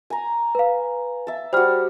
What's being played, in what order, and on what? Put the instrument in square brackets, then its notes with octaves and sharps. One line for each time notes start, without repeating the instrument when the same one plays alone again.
[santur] G#5 A#5
[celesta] B4 F5
[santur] E5 A5
[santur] G3 F#4 [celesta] C5 F6